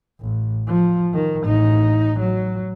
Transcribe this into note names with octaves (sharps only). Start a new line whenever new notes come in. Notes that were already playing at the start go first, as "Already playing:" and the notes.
A1
F3
D#3
A1 D#4
F#3